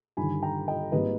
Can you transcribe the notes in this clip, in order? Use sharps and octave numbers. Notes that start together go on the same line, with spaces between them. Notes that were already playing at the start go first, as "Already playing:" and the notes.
G1 G2 D#3 G#5 B5
G5 A#5
D#5 G5
G#1 G#2 G3 A#3 B4 D#5